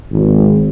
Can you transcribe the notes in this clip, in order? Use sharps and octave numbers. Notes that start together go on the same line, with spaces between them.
G#1